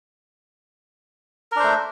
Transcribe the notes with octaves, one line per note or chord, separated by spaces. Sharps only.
A3 D4 A#4 C5